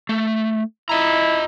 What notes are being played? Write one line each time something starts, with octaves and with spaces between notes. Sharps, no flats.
A3
E4 F4 D#5 A#5